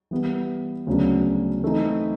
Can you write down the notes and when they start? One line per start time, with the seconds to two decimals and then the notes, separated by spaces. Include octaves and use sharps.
0.11 E3 G3 B3
0.87 D2 C#3 F#3 B3 D4
1.63 E3 A3 C4 D#4